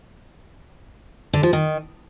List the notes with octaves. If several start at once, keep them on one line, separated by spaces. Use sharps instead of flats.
D3
F3
D#3